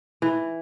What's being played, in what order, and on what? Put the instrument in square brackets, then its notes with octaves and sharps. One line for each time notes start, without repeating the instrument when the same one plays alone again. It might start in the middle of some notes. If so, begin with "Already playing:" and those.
[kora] E3